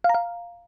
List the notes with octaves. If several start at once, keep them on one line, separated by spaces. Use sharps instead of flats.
F5
A#5
F5